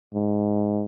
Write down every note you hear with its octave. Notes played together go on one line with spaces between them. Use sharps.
G#2